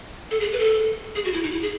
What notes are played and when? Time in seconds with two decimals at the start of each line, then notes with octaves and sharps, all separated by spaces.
0.31 A4
0.40 G#4
0.53 B4
0.59 A4
1.15 G#4
1.24 F#4
1.33 E4
1.43 D#4
1.51 E4
1.62 G#4